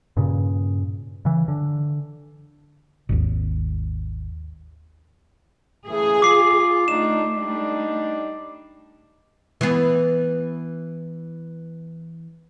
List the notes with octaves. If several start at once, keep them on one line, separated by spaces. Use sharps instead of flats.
G2 A#2 C#3
C#3 E3
D3
G#1 D#2
C#3 E3 A3 G#4
F4 D6 C7
D3 A3 D4 D#4 E7
G3 D4 D#4
E3 B3